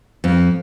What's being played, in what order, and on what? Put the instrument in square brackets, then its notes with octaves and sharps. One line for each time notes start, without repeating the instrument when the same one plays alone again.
[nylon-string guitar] F2